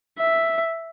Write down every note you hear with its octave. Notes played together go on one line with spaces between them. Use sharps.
E5